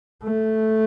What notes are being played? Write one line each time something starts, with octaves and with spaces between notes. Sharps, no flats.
A3